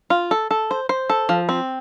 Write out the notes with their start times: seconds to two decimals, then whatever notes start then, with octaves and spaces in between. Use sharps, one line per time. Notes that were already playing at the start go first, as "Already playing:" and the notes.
0.10 F4
0.31 A4
0.51 A4
0.71 C5
0.89 C5
1.10 A4
1.29 F3
1.49 C4